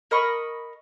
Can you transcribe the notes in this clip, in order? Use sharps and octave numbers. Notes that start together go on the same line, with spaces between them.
A#4 D#5 B5 C#6